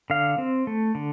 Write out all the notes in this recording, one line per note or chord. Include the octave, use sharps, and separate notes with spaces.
D3 F5
C4
A3
D3